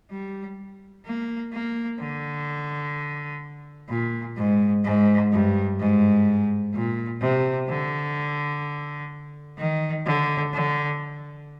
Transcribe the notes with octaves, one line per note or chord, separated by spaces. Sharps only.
G3
A#3
A#3
D3
A#2
G#2
G#2
G2
G#2
A#2
C3
D3
D#3
D3
D3